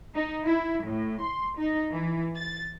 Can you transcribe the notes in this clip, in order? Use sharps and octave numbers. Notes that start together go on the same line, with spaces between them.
D#4
E4
A2
C6
D#4
E3
A6